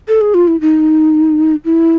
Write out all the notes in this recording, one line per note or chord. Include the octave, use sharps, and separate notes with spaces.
A4
G#4
F4
E4
D#4
E4